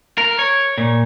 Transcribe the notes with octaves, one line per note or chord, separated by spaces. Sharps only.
A#4
C#5
A#2